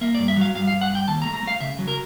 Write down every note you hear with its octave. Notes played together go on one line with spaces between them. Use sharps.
A#3 E5
D5
G2
E5
F#3 F5
G2 F5
F5
G2
F#5
G2
G5
D#2 A5
A#5
A3
A#5
A3 F5
C#3 E5
F#3
A#4